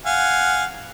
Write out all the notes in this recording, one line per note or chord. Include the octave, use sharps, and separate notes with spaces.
F5 F#5 G#5